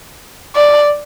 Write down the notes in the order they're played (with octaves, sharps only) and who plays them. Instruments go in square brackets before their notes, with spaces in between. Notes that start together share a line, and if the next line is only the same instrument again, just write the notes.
[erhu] D5